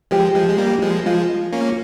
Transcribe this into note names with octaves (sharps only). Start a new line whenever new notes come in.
F3 G#3 G4
F3 G#3
G#3
G3 A#3
F3 G#3
F3 G#3 F4
A#3 C#4